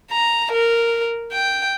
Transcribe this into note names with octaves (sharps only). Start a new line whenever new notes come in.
A#5
A#4
G5